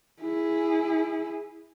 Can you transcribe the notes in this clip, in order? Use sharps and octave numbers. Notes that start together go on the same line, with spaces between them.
E4 G#4